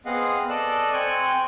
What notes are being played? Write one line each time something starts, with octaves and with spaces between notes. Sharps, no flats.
B3 C4 G#4 D#5 F5 F#5
A4 D5 D#5 E6 F#6
C4 G5 G#5 C#6 F#6